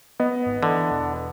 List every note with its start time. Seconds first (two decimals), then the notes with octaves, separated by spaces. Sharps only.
0.20 B3 D#5
0.46 G#1
0.63 D3 E3
0.91 E1